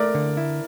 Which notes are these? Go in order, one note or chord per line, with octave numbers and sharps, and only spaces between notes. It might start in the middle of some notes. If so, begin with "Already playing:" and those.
Already playing: A3 A#4 D5
D3
E4